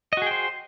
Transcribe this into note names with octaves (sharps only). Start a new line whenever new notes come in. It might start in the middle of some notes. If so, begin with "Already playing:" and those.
F#4 G#4 C5 D#5 G5